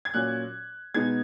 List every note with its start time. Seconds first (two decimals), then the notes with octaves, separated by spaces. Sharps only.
0.05 G#6
0.14 A#2 F#3 C#4 F#6
0.94 B2 G#3 B3 D#4 G#6